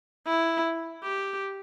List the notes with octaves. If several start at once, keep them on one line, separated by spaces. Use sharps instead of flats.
E4
G4